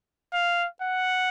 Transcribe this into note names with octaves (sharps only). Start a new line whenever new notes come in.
F5
F#5